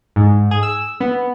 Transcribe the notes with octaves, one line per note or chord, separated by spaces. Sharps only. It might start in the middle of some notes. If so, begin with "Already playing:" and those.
G#2
G#4
E6
B3